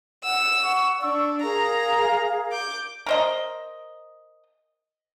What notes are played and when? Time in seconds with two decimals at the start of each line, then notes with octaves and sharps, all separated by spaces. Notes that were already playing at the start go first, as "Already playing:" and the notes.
0.24 F#5 E6
0.60 F#5 C#6
1.01 D4 C#6 E6
1.42 G#4 A#4 F5 A#5
2.51 D6 G6
3.06 A#4 C5 D#5